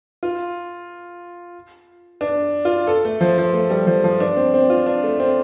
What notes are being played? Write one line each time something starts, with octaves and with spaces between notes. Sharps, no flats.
F4
D4
F4
A4
A3
F3
F3
A3
G3
F3
F3
D4
C4
C4
F4
D4
A3
C4